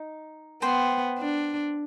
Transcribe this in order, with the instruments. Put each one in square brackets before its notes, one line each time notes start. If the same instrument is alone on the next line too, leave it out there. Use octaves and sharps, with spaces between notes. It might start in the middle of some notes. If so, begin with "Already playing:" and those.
Already playing: [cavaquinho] D#4
[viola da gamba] B3 [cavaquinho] C5 G5 C6
[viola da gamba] D4